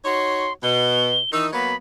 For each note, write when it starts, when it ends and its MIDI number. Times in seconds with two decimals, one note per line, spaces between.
0.05 0.49 63
0.05 0.49 66
0.05 0.49 73
0.05 0.53 84
0.63 1.18 47
0.63 1.33 103
1.33 1.49 51
1.33 1.49 52
1.33 1.49 63
1.33 1.47 88
1.53 1.74 54
1.53 1.74 58
1.53 1.74 59
1.53 1.76 83